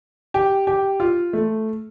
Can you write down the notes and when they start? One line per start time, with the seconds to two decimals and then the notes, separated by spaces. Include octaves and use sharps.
0.34 G4
0.67 G4
1.00 F4
1.33 A3